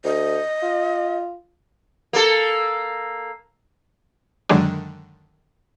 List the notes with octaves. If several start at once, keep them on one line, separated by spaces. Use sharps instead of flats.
D2 D#5
F4
A#3 A4
F#2 D3 D#3 F#3 G#3 D4